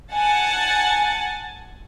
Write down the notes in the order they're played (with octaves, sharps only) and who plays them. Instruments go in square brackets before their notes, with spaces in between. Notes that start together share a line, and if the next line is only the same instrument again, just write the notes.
[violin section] F#5 G#5 A5 A6